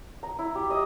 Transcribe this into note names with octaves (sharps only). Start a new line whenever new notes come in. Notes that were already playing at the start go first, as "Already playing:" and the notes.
A#5
E4
G4
D#5